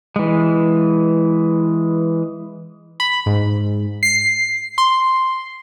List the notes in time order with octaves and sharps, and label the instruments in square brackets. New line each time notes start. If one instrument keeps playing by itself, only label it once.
[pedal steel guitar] E3 G#3
[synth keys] B5
G#2
C7
C6